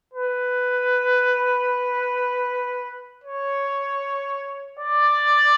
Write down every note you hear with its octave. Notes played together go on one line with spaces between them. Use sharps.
B4
C#5
D5